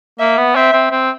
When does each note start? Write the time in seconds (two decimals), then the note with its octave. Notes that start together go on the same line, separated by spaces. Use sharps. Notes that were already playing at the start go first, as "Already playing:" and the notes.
0.19 A#3 E5
0.37 B3
0.56 C4 E5
0.73 C4
0.91 C4